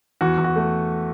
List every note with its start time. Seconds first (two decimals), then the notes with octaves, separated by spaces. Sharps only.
0.21 E2 F#4
0.38 E2
0.44 F#4
0.56 A3